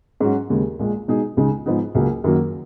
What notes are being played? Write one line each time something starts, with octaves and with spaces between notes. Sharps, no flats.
G#2 F#3 C#4 F#4
D#2 C#3 G#3
A#1 A#2 G#3
B2 G#3 D#4 G#4
C#2 C#3 G#3 D#4
G#2 F3 B3 D#4 G#4
C#2 C#3 F#3 A#3
F#2 D#3 F#3 A#3